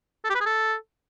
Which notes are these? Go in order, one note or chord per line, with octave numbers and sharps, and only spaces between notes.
A4
G4
B4
G#4
A4